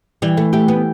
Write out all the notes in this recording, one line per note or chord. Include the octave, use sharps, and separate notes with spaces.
E3 G3
A3
A3 G4
B3